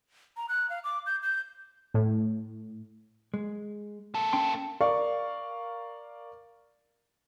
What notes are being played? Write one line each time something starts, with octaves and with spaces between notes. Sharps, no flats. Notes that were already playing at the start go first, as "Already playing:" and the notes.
A#5
F#6
F5
D6
G6
G6
A2
G#3
A#3 A4
C#4 G5 C6
A#4 D5 F5 C#6